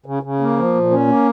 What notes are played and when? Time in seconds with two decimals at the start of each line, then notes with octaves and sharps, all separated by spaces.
0.06 C#3
0.23 C#3
0.41 A#3
0.57 F3
0.74 A#2
0.91 C#4
1.07 A#3